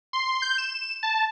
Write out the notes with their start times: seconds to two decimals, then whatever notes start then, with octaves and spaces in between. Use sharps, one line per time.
0.13 C6
0.42 G6
0.58 E7
1.03 A5